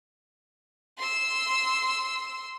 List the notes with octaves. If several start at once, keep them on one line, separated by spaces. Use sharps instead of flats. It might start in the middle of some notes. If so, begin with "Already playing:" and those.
C6 E6